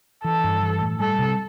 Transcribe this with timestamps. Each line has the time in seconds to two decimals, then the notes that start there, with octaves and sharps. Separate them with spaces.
0.24 E3 A4
0.44 G2
0.63 E3
0.81 A2
1.00 G3 A4
1.19 C3